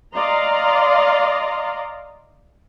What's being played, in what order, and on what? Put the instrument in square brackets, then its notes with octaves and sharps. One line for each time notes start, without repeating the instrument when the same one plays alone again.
[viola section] D5 D#5 F5 A#5 C6